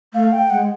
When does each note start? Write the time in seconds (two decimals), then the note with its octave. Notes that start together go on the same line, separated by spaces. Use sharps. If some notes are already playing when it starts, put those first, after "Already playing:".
0.14 A3 F5
0.33 G5
0.50 G#3 F#5